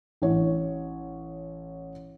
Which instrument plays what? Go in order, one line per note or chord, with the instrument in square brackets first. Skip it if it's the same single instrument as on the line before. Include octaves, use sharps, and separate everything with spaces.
[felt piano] A1 C#5